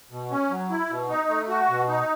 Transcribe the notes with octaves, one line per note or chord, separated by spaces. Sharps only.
B2
C#4
F#3
E4
B2
D#4
A3
F#4
B2
D#4